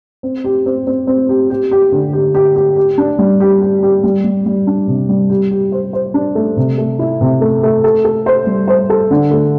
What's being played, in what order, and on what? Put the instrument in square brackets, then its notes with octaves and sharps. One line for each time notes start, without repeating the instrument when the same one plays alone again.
[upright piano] C4
G4
C4
C4
C4
G4
G4
G4
D3
G4
G4
G4
G4
D4
G3
G4
G4
G4
G3
G3
G3
D4
C3
G3
G4
G4
C5
C5
D4
A3
C3
A3
E4
C3
A3
A3
A4
A4
C5
G3
C5
A4
D3
A3